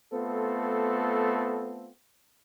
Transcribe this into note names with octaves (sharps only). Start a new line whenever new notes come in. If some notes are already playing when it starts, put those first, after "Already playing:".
A3 B3 C4 F4 A4